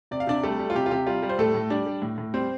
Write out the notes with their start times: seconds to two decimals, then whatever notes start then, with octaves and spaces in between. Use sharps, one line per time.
0.11 C3 D5
0.20 F5
0.27 C3 D4 D5
0.43 G3 A3 A4
0.59 G3
0.70 F4
0.75 C3 G4
0.86 F4
0.91 C3 G4
1.07 G3 F4
1.23 G3
1.29 C5
1.38 A2 A3 A4
1.55 A2
1.70 G3 D4 D5
1.86 G3
2.02 A2
2.18 A2
2.34 G3 C4 C5